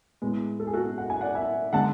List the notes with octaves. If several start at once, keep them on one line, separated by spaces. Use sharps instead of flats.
A2 G#3 B3
A4
G#4
F#4 A4
F#5
G#5
D5 F#5
E5 G#5
D3 G#3 F#5 A5